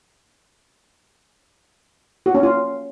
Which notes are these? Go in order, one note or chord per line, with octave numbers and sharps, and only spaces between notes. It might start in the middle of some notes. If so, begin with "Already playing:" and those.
F#4
C#4
F4